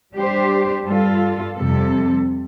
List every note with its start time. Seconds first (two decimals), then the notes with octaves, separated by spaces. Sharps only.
0.14 G3 D4 G4 C5
0.84 G2 G3 F4 A4
1.55 F2 C3 G3 C4 A4